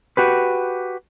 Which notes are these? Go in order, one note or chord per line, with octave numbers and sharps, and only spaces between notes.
F#4 G4 B4